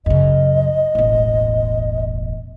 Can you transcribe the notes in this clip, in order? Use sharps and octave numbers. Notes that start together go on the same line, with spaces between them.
F#2 C#3 D#5
E1 A1